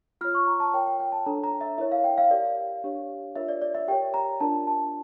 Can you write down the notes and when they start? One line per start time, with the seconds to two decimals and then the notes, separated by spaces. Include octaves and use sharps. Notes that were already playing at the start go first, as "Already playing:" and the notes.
0.21 F4 C#5 F6
0.35 C#6
0.47 A#5
0.60 A5
0.74 F4 A#4 C#5 G5
0.87 G5
1.00 G5
1.12 A5
1.26 D4 A4 C#5 A#5
1.43 A#5
1.61 E5
1.78 E4 A#4 C#5 E5
1.92 F5
2.04 G5
2.18 F5
2.31 G4 A#4 D5
2.84 D4 G4 C#5
3.36 D4 F4 A#4 C#5 E5
3.48 D5
3.62 D5
3.75 E5
3.88 G4 A#4 C#5 G5
4.14 A#5
4.40 D4 F4 A#4 D5 A5
4.67 A5